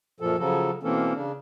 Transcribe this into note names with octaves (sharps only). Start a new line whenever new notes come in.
F#2 A#2 F3 A4
C#3 F3 F#3 A4
B2 E3 A#3 C4 C#4 A4
C#3 D4